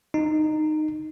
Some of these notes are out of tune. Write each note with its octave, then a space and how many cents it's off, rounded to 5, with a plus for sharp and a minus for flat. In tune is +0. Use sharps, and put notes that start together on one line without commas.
D#4 -15